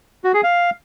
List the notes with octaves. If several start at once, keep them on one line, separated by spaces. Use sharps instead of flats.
F#4
G#4
F5